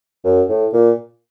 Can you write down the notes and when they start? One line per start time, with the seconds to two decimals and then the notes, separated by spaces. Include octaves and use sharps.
0.24 F#2
0.49 A2
0.73 A#2